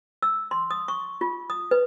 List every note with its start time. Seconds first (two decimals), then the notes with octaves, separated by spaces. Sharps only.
0.23 E6
0.51 C6
0.71 D#6
0.88 C#6
1.21 F4
1.50 D#6
1.71 B4